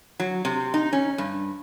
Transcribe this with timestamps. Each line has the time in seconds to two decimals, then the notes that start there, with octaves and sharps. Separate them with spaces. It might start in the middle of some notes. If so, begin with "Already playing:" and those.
0.20 F#3
0.45 C3
0.74 D#4
0.93 C#4
1.18 G2